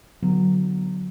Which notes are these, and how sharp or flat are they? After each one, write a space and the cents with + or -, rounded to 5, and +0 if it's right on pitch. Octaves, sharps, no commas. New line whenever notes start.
D3 +0 F#3 +0 B3 -10